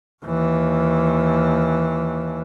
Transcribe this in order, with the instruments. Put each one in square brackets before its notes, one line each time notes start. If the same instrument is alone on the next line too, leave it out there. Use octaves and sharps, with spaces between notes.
[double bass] D#2 E3